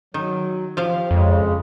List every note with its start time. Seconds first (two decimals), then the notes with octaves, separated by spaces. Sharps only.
0.14 D#3 F#3
0.77 F3 G4 F5
1.11 F2 C#3 G#3